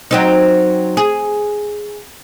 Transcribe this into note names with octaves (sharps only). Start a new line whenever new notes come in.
F#3 C4 D#4
G#4